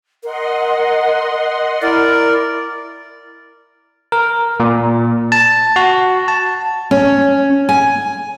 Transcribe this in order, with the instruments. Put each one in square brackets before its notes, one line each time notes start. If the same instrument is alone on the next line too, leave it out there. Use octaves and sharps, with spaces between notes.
[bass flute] A#4 [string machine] D#5 F#5 C6
[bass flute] E4 [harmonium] A#4 D5
[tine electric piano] A#4
A#2
A5
F#4
A5
[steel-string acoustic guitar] C#4
G#5